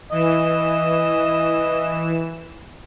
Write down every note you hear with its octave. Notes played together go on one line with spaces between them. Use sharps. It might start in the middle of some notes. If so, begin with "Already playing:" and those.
E3 D#5 E7